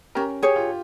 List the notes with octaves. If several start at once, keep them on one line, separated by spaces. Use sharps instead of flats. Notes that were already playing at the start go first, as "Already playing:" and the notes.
C#4 G4 A#4
G4 G#4 C#5
F4